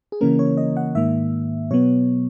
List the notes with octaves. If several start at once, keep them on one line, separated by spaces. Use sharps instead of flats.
G#4
C#3 E3 A#3 C#4 A#4
C#5
D#5
F#5
G#2 D#3 A#3 E5
B2 F#3 B3 C#5